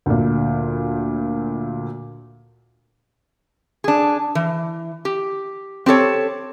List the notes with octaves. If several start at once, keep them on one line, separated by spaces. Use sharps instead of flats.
D2 A#2
D4 G#4
E3
G4
C4 G4 A4 C#5